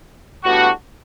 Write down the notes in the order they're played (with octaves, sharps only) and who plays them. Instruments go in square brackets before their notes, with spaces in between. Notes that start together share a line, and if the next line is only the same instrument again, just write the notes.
[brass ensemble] A2 G3 B3 D4 F#4